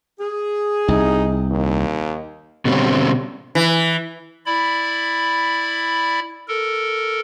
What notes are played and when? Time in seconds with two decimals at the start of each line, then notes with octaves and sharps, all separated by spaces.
0.20 G#4
0.88 C2 D#4
1.51 D#2
2.65 B2 D3 G3 A3 C4 C#4
3.55 E3
4.46 E4 D5 B5
6.48 A4 A#4